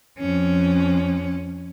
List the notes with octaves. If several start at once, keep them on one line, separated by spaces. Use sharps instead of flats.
F2 C#4